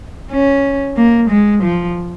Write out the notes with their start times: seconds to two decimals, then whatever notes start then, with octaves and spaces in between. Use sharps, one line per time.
0.31 C#4
0.96 A#3
1.30 G#3
1.63 F3